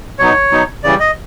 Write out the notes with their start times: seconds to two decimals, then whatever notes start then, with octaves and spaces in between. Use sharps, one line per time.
0.19 B2 F#3 B3 D#4 C#5
0.51 B2 F#3 B3 D#4
0.84 C#3 E3 G3 D5
1.00 D#5